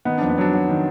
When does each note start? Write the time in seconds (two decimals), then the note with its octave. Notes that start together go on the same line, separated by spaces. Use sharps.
0.05 D#3 B3 D#4
0.18 F2 D4
0.29 B3
0.38 F#3 D4
0.53 F#3
0.69 D#3